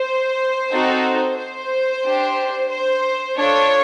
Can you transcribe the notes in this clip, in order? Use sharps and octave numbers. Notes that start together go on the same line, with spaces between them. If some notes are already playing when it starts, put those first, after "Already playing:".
Already playing: C5
C4 D#4 F#4 A4
C5
D4 G4
C5
D4 F4 A4 C#5